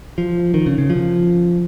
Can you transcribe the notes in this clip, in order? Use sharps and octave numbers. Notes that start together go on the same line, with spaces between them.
F3
D#3
C#3
C#3
F3